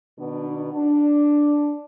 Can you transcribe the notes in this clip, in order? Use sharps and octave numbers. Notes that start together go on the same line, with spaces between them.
B2 D#3 B3 D4
D4